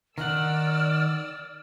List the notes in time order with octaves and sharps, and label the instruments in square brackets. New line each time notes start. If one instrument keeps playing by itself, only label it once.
[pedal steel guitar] D#3 F#5 [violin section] D5 E6 [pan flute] F6